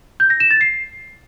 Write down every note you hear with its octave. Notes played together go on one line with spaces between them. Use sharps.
G6
A#6
E7
A6
C7